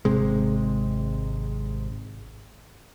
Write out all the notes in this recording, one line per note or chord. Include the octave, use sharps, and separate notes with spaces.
G#1 C3 G#3